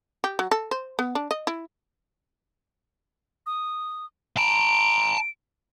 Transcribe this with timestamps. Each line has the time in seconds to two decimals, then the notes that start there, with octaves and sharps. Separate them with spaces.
0.24 G4
0.39 F#3
0.51 A4
0.71 C5
0.99 B3
1.15 D4
1.31 D#5
1.47 E4
3.46 D#6
4.38 A5 A#5 D7